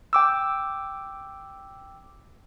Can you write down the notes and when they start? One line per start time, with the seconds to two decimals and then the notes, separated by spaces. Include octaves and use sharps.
0.13 G5 D6 E6